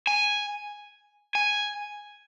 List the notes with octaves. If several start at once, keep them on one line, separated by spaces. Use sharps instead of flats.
G#5
G#5